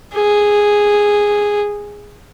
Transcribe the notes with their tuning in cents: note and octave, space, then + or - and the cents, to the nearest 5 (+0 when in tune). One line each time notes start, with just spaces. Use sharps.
G#4 -5